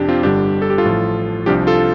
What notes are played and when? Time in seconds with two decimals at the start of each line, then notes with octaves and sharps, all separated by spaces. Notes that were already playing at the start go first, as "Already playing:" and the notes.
Already playing: F2 C3 D4 G4
0.08 C4 F4
0.23 G1 G2 D3 G3 D4 G4
0.62 A4
0.70 G4
0.78 F4 A4
0.85 A1 A2 F3
1.46 C2 C3 F3 D4 G4
1.67 F4 A4